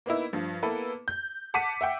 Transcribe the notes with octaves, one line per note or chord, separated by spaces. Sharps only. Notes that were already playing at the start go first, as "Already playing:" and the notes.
A#3 B3 D#4 E4
G2 F3
A#3 B3 E4 A4 B4
G6
F#5 A5 D6 B6 C#7 D#7
E5 F#5 G5